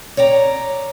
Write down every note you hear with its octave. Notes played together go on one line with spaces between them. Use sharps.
C#5 D5 G5 A#5